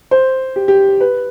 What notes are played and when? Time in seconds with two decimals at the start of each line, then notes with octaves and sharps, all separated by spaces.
0.11 C5
0.56 G4
0.68 G4
1.00 B4